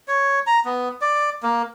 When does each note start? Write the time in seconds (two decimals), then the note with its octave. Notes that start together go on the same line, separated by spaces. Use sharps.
0.08 C#5
0.47 A#5
0.65 B3
1.01 D5
1.43 A#3